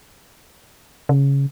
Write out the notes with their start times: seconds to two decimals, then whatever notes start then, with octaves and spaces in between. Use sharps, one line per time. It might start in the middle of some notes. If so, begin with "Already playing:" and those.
1.09 C#3